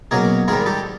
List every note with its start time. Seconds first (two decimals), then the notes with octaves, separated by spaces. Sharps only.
0.11 B2 F#3 A#3 C#4 G#4 A#4
0.48 G#2 D#3 G3 G#4 A#4
0.66 G4 A4